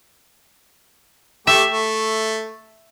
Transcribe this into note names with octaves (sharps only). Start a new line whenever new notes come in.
A3 G4 E5
A3